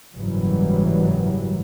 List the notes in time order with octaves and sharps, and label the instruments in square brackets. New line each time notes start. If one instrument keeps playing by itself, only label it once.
[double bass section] F#1 G#2 E3 F#3 G3